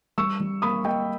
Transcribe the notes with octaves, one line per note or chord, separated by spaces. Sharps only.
G3 C#6 E6
G3
A#3 B5 D#6
A#3 D#5 G5